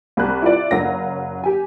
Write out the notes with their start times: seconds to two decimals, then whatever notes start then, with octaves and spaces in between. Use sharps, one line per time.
0.17 C2 B5 F#6
0.42 E4 F4 D5
0.71 F#1 F#3 F5 A#6
1.44 G4 G#5